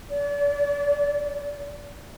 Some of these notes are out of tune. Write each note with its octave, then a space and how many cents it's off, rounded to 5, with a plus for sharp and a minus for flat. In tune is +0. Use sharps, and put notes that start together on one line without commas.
D5 -35